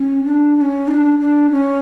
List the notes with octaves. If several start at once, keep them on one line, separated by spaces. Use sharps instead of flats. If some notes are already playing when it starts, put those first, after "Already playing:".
Already playing: C#4
D4
D4
C#4
D#4
D4
D4
C#4